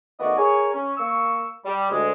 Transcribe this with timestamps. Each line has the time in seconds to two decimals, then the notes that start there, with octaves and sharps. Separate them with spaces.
0.19 D#3 A3 B3 F#4 D5 D#5
0.37 G#4 A#4 C#5
0.73 C#4
0.97 A#3 C#6 E6
1.65 G3
1.90 D2 G#3